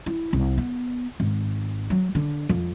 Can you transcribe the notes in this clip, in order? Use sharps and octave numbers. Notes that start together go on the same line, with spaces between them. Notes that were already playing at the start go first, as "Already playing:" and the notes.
E4
C2
B3
G#1
F#3
D3
F2